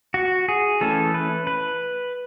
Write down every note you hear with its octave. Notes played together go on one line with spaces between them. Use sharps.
F#4
G#4
E3 A3 C#4 A4
B4
B4